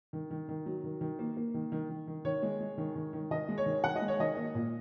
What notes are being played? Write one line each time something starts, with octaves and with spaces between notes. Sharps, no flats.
D#3
D#3
D#3
F#3
D#3
D#3
A#3
A#3
D#3
D#3
D#3
D#3
D#3 C#5
G#3
G#3
D#3
D#3
D#3
D#3 D#5
G#3
C#5
D#3
D#3 F#5
D#5
G#3
C#5
D#3 D#5
A#3
A#2